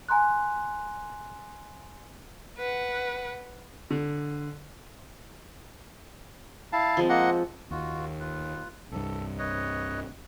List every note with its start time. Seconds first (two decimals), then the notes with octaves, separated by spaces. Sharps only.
0.09 G#5 A#5 C6 F#6
2.58 B4 F#5
3.90 D3
6.73 E4 F5 A5
6.97 F3 G#3 C4
7.09 A#3 D#5 F#5
7.71 D#2 F4 F#4
8.20 F4 B4
8.91 C2 G2 A4
9.38 B4 C#5 D#5